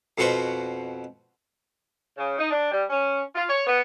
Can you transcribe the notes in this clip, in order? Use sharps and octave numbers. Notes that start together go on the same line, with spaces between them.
F2 B2 F#4 B4 C5 C#6
C#3
D#4
D4
G3
C#4
F4
C#5
B3